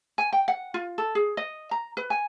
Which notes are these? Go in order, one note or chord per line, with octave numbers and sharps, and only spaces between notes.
G#5
G5
F#5
F4
A4
G#4
D#5
A#5
B4
G#5